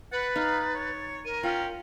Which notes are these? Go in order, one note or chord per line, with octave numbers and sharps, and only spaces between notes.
B4 F#5 A6
D#4 F5
C#5
A#4 D#7
C#4 F4 G5